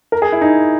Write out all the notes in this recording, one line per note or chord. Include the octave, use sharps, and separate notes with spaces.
A#4
G#4
E4
D#4